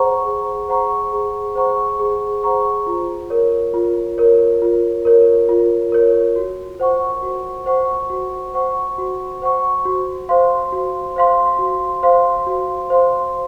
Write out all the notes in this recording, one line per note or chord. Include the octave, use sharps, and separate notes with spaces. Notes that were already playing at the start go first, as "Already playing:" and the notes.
Already playing: G#4 C5 F#5 A#5 C#6
G#4
C5 F#5 A#5 C#6
G#4
C5 F#5 A#5 C#6
G#4
C5 F#5 A#5 C#6
F4
A#4 C#5
F4
A#4 C#5
F4
A#4 C#5
F4
A#4 C#5
F#4
C5 F#5 C#6
F#4
C5 F#5 C#6
F#4
C5 F#5 C#6
F#4
C5 F#5 C#6
F#4
C5 F5 C6
F#4
C5 F5 C6
F#4
C5 F5 C6
F#4
C5 F5 C6